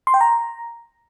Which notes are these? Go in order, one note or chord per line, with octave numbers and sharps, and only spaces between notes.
C6
G5
A#5